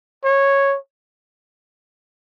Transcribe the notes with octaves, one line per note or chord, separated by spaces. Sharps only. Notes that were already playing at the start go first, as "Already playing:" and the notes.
C#5